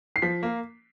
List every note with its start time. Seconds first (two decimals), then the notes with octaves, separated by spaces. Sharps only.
0.16 C7
0.22 F3 B6
0.43 A#3